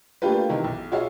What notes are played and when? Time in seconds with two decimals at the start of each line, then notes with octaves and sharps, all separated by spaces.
0.22 A3 A#3 D4 F4 G4 B4
0.49 C3 D#3 E3 E4
0.64 B1
0.92 F4 F#4 G#4 C#5 E5 F5